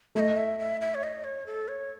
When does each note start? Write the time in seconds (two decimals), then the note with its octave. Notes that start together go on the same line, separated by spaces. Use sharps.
0.15 A3 E5
0.20 D#5
0.37 E5
0.59 E5
0.81 E5
0.95 C#5
1.03 D#5
1.24 C#5
1.46 A4
1.68 C#5